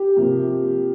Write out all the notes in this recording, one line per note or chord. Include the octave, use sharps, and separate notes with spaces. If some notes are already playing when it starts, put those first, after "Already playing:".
Already playing: G4
C3 F3 A#3